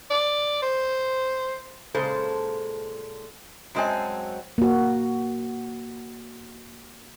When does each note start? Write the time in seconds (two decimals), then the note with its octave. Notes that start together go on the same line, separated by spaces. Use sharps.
0.10 D5
0.62 C5
1.95 A#2 C#3 G#3 A4 C5
3.75 F#2 F#3 G#3 C4 G#5 A5
4.58 A#3 F#4